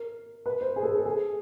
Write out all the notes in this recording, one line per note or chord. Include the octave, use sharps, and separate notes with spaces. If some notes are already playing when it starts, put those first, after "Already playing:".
Already playing: A#4
B4
C5
G#4
A4
G#4
A4
G#4